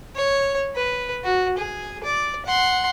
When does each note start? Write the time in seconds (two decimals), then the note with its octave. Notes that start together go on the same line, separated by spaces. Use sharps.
0.15 C#5
0.75 B4
1.24 F#4
1.58 G#4
2.04 D5
2.46 F#5 C6